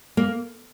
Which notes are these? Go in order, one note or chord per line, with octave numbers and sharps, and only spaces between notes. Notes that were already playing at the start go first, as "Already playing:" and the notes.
A#3